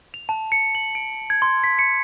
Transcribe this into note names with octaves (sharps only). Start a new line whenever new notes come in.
F7
A5
C#7
F#7
D7
G#6
C6
B6
C#7